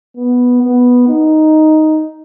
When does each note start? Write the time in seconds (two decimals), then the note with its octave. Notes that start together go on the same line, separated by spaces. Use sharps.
0.17 B3
0.63 B3
1.08 D#4